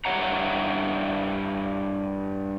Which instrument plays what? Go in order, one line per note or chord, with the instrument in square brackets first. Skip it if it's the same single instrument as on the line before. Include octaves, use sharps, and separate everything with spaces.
[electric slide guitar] G2 E4 G4 C#5 F#5 A#5